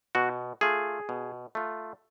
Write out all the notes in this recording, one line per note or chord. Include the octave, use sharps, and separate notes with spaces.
B2 F#4
A3 F4 G#4
B2
A3 F4